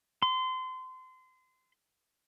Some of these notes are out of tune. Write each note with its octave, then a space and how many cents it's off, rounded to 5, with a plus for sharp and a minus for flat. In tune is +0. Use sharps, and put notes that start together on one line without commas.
C6 -30